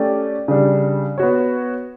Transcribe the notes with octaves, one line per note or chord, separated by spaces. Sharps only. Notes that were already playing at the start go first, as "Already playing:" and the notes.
Already playing: A3 C#4 G4 D5
C#3 G3 D4
B3 F#4 C#5